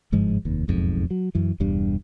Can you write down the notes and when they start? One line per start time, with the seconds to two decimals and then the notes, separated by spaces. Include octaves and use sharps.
0.12 G1 G#2 F3 G#3
0.45 F1 D#2
0.68 E1 B1 F2 G#2
1.11 F#3
1.35 F#2 E3
1.60 E1 E2 G2 G3